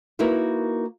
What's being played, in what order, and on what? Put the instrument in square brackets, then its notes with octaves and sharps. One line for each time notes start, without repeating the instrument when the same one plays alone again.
[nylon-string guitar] A#3 D#4 E4 F#4 A#4 B4